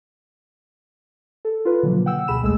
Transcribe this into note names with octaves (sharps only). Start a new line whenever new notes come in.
A4
F4 B4
B2 D3 D#3 F3 F#3 A#3
F#5 G5 E6
D2 B2 G#4 B5 E7
B1 E2 G#3 A3 G#4 E6